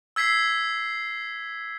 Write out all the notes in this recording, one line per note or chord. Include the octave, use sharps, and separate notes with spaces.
E6 G#6 B6 C7